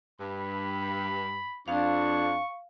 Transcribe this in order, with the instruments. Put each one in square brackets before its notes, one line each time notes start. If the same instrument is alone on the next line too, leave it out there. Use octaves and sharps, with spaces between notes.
[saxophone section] G2 [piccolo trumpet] B5
[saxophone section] F2 [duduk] D4 [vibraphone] F5 [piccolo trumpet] C#6